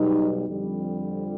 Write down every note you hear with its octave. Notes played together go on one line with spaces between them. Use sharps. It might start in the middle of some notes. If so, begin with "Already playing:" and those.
Already playing: B1 B2 G3 D#4
F2 D3 G3